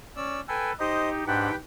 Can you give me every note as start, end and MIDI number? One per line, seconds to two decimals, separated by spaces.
0.16 0.40 61
0.16 0.40 74
0.16 0.40 88
0.49 0.73 69
0.49 0.73 71
0.49 0.71 79
0.49 0.71 80
0.80 1.24 63
0.80 1.24 67
0.80 1.09 72
0.80 1.09 75
1.27 1.50 44
1.27 1.50 62
1.27 1.56 67
1.27 1.56 71
1.27 1.50 78
1.27 1.56 79